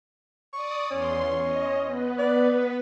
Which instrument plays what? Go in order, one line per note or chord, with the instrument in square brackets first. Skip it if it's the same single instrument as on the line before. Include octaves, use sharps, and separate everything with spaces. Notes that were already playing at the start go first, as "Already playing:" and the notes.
[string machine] D5 D#6 [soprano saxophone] C#6
[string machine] E2 C6 [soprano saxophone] C#4
[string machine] D#5
B3 B4
[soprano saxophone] D5